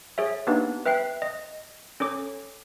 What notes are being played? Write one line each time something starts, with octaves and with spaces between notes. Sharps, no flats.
G#4 C#5 E5
A#3 B3 D4 D#4 G4 B4
B4 E5 G5 F#6 C7
D#5
C#4 A4 C#5 D6